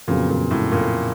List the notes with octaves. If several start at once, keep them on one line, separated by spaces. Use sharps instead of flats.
F2 A#2 C#3 F#3 B3
A#2
A2
A#2